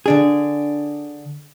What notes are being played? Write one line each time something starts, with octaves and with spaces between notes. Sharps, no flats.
D3 D4 G#4